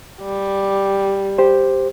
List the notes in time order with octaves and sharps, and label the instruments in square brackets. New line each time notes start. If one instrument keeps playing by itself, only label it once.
[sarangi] G3
[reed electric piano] G4 C5